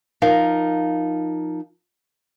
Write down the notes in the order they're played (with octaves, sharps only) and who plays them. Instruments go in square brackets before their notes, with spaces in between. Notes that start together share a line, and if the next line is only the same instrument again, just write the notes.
[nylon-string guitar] F3 D#4 A#4 F5